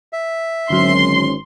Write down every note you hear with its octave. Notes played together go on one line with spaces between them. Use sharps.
E5
G#1 D3 F#3 C#4 C6